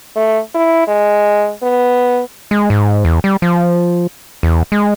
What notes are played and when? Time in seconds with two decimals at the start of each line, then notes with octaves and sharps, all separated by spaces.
0.16 A3
0.54 E4
0.87 G#3
1.62 B3
2.51 G#3
2.70 G#2
3.05 E2
3.24 G3
3.42 F3
4.43 E2
4.72 G#3